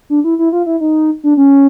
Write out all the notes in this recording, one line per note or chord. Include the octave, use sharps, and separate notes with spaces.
D4
E4
E4
F4
E4
D#4
D4
C#4